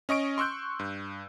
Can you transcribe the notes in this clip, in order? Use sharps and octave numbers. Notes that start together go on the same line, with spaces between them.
C#4 D#5 C#6 D7
C6 C#6 E6 F#6 G6
G2